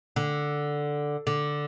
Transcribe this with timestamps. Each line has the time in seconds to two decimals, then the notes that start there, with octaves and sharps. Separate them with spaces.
0.16 D3
1.27 D3